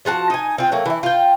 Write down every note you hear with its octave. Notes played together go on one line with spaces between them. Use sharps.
F3 F4 F#4 A5
D#4 G#5
C4 F4
F#3 A3 A#3
E3 E4
F4 G5